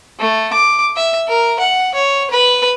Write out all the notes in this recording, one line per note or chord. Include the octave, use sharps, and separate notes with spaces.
A3
D6
E5
A#4
F#5
C#5
B4